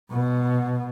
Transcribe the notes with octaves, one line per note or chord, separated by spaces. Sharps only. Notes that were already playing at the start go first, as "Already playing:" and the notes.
B2